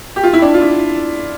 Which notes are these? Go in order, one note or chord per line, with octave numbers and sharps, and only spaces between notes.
G4
F4
E4
D4
F4
E4